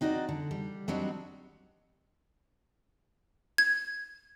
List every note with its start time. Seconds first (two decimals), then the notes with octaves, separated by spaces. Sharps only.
0.01 C4 D#4 F#4 B4 D5
0.29 D3
0.51 G3
0.88 F#3 G3 C4 D4 D#4 F#4
3.58 G#6